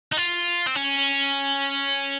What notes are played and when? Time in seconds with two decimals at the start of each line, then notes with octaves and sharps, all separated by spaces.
0.13 D#4
0.17 F4
0.67 C4
0.75 C#4